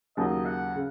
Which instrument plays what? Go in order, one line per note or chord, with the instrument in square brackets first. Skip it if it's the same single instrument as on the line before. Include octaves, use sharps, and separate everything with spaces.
[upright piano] D#2 C#3 F#3 [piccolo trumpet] D#5
[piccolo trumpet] F#5
[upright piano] C#3